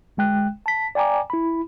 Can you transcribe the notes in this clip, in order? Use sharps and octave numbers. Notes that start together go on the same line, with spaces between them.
G1 G#3 G5 F#6
A5 B6
D5 G5 G#5 A#5 D6
E4 B5